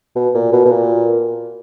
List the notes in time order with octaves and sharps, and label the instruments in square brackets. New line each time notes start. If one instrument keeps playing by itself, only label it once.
[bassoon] B2
A#2
B2
B2
A#2